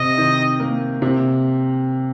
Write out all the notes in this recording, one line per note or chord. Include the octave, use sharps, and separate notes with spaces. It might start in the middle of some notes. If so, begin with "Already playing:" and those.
Already playing: C3 D#5
D#3
A#3
C3